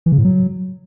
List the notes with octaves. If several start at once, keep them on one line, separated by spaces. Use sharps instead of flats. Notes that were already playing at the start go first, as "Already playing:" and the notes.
E3
C#3
A2
F#3